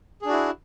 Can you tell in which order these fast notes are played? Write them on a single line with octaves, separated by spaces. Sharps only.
G#4 D4 F#4 E4